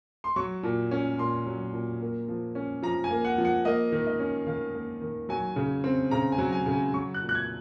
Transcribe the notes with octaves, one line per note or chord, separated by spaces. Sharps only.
C6
F#3 C#6
A#2
C#4
A#2 C6
F#3
A#2
A#3
F3
C#4
F3 A#5
G#5
A#3
F#5
F3
F#5
A#3 D#5
D#3
D#5
C#4
D#3 F5
A#3
D#3
F#3 G#5
C#3
C4
C#3 A#5
G#5
F#3
G#5
C#3
G#5
F#3 C#6
F#6
A#2
F#6
G#6